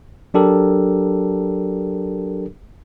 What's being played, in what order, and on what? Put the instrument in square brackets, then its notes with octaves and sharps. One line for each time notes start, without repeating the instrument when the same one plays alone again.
[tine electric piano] F#3 D4 G4 A4 A#4